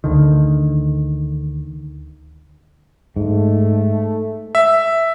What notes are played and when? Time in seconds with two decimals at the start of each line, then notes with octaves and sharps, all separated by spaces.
0.04 D2 D3 D#3
3.16 G#2 A3
4.55 E5